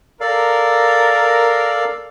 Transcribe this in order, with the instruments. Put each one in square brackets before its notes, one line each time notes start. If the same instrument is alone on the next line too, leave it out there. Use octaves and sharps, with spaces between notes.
[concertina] A4 D5 F5 [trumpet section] A#4